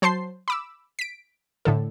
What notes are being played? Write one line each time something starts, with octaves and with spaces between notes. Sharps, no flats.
F#3 C5 A5 C6 C7
B5 D6 E6
B6 D7
A2 D3 A4